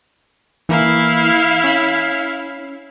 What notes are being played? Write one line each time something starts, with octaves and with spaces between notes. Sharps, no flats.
E3 A#3 E4 F5
C#4 B5